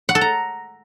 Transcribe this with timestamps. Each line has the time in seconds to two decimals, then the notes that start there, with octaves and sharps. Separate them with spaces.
0.09 F#5
0.15 A4
0.21 A#5